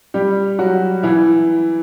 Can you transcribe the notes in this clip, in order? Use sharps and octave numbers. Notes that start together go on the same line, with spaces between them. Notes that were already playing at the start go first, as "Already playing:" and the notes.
G3 G4
F#3 F#4
E3 E4